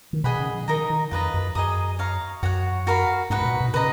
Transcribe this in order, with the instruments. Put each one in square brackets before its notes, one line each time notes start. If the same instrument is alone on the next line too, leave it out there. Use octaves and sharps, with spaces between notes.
[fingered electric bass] D#3
[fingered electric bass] B2 [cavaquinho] G#4 D#5 F#5 B5
[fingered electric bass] C#3
F3
[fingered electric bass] D#3 [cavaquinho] D#4 A#4 D#5 A#5
[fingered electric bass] D#3
[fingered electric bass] F2 [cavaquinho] F4 B4 D#5 A#5
[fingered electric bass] F#2
[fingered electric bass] F#2 [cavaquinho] G#4 D#5 A#5 D#6
[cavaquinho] C#5 F5 A#5
[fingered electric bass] F#2 [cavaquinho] F#4 C#5 F#5
[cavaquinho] F#4 A#4 F5 B5
[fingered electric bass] G#2 [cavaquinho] D#4 F#4 B4
[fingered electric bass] G#2
A#2
B2
[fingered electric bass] C#3 [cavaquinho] B4 D#5 A#5